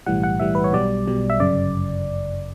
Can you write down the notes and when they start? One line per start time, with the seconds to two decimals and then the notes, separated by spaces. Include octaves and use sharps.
0.06 B1 A2 E3 G3 F#5
0.23 F#5
0.40 B1 A2 E3 G3 E5
0.55 B4
0.64 C#5
0.73 B1 B2 G3 D5
1.06 B1 B2 G3
1.30 E5
1.40 G1 F#2 C#3 D5